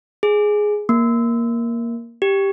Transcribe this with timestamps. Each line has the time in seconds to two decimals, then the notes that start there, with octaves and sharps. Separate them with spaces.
0.23 G#4
0.89 A#3
2.22 G4